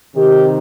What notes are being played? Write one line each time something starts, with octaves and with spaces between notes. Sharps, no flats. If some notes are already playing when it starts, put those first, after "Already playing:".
C3 D#3 G4